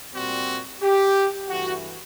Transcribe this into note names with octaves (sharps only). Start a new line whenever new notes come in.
A#2 G3 C4 F#4
G4
G2 E3 A3 F#4